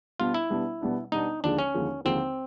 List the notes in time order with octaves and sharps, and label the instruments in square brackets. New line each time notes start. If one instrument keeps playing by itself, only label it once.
[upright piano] B2 G3 B3 D4 [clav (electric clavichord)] F4
[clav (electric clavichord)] E4
[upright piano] B2 G3 B3 D4
B2 G3 B3 D4
[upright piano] B2 G3 B3 D4 [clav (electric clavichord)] D#4
[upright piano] D#2 D3 F3 G#3 [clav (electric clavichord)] D4
[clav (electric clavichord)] C#4
[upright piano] D#2 D3 F3 G#3
[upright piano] D#2 D3 F3 G#3 [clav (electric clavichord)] C4